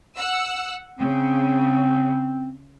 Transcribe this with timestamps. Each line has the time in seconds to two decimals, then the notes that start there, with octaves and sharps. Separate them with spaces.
0.17 F#5 E6
0.99 C#3 C4